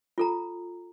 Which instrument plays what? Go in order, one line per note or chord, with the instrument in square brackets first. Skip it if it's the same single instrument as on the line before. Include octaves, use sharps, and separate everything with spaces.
[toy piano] F4 A4 A#5